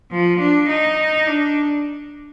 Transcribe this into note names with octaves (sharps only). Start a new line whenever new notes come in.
F3
D4
D#4
D4